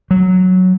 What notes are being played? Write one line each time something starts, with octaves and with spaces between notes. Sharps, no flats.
F#3